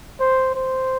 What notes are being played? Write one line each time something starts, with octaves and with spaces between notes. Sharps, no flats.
C5
C5